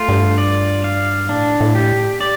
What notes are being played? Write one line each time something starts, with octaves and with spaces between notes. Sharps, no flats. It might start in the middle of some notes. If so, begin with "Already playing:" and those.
Already playing: A3 F4
G2
D5
F5
A2 D4
A2
G4
D5